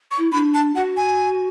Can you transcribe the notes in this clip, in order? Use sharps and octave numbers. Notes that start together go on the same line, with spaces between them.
C#6
E4
D4 B5
A5
F#4 F#5
G#5